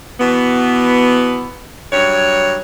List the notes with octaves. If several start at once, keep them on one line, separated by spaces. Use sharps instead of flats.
B2 E3 B3
G2 F#3 C#5